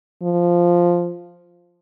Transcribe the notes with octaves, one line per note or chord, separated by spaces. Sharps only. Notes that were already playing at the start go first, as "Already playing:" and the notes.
F3